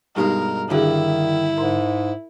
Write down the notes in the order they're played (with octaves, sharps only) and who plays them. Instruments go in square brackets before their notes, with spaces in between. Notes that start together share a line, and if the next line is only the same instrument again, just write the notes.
[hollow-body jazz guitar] G2 B2 G#3 [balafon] G3 D#4 G4 [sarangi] A#4
[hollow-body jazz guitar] G2 D3 [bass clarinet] D#3 [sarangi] E4 [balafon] F#4 G#4
[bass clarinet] G#2 [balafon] A#4 A#5 C6